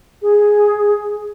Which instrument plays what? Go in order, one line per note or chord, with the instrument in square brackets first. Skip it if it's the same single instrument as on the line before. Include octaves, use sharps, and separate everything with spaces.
[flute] G#4